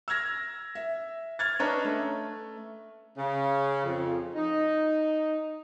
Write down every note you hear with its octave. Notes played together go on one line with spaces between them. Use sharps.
E6 F6 G#6 A#6
E5
F6 G#6 A6
C#4 D4 B4 C#5 D#5 A#5
A3
C#3
F2
D#4